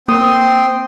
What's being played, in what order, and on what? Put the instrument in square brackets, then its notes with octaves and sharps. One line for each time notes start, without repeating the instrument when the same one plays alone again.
[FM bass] A#3 [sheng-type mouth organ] C4 G5 C6 [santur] D#6